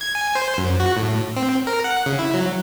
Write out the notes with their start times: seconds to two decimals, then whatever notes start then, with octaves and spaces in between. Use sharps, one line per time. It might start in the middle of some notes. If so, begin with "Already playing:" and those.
0.01 G#6
0.15 G#5
0.35 C5
0.58 F#2
0.80 F#4
0.96 A2
1.37 C4
1.67 A#4
1.84 F#5
2.06 C#3
2.19 E4
2.34 F#3